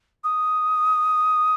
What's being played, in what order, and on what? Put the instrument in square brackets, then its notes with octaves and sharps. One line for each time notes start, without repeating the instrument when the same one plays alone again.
[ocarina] D#6